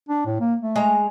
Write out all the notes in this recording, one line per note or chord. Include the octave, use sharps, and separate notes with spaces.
D4
A2
A#3
A3
G#3 A#5